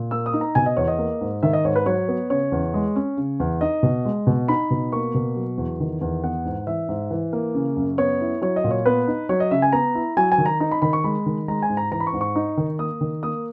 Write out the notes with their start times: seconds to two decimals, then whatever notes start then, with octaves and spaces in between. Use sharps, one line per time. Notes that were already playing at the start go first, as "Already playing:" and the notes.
Already playing: A#2
0.11 A#3 E6
0.26 D#6
0.34 D#4
0.41 A#5
0.55 B2 G#5
0.66 D#5
0.77 E2 C#5
0.88 D#5
0.98 A#3
1.21 G#2
1.43 D#3 E5
1.53 D#5
1.65 G#2 C#5
1.76 B4
1.86 F#3 C#5
2.08 B3
2.30 C#3 C#5
2.52 E2
2.74 G#3
2.96 C#4
3.17 C#3
3.40 E2
3.61 D#4 D#5
3.83 B2
4.05 G#3
4.27 B2
4.48 D#4 B5
4.71 B2
4.92 A#3 C#6
5.14 B2
5.36 F#3
5.58 E2
5.80 D#3
6.01 E2
6.23 B3 F#5
6.45 G#2
6.67 E3 E5
6.89 G#2
7.11 E3
7.33 A#3
7.54 C#3
7.77 F#2
7.98 B3 C#5
8.21 E4
8.42 F#3 C#5
8.56 D#5
8.64 A#2
8.71 C#5
8.86 B3 B4
9.08 D#4
9.29 F#3 C#5
9.40 D#5
9.51 C#3 E5
9.62 G#5
9.73 B3 A#5
9.95 E4
10.17 F#3 G#5
10.32 G#5
10.38 D#3
10.46 A#5
10.60 D#4 A#5
10.71 B5
10.82 D#3 B5
10.93 C#6
11.04 G#3 B5
11.26 D#3
11.48 G#3 A#5
11.63 G#5
11.70 G#2
11.77 A#5
11.91 E3 A#5
12.00 B5
12.07 C#6
12.13 G#2
12.21 C#6
12.36 D#4
12.57 D#3
12.79 A#3 D#6
13.01 D#3
13.23 A#3 D#6